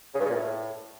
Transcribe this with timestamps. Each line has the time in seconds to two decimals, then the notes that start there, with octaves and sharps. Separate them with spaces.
0.15 C#3
0.20 G2
0.25 C#3
0.30 A#2
0.35 A2